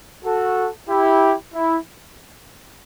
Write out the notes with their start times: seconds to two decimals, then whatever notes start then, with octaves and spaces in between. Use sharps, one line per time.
0.24 F#4 A4
0.88 E4 G4
1.54 E4